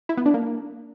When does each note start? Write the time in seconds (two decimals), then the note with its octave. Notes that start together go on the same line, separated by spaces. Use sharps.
0.09 E4
0.17 B3
0.26 D4
0.34 A#3